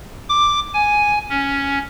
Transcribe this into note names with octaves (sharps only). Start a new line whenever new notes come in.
D6
G#5
C#4